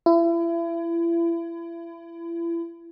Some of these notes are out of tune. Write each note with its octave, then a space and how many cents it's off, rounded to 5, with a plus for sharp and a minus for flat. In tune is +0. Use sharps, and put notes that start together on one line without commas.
E4 +35